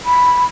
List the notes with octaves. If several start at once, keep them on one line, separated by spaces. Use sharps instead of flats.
B5